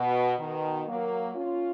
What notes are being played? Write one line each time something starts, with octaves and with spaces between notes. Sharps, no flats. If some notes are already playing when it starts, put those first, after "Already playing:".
Already playing: B2
B2 D#3
F#3 A#3
C#4 F4